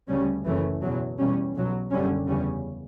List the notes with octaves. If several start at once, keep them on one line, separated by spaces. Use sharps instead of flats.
D2 C#3 G3 C#4
F#1 F#2 E3 A3 C#4
E2 B2 F#3
E2 B2 G3 C#4
B1 B2 F#3
F#1 F#2 D3 G3 C#4
E2 C#3 G3 C#4